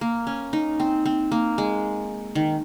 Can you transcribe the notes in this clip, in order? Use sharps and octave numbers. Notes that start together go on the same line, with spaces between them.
A#3
C#4
D#4
C4
C4
A#3
G#3
D#3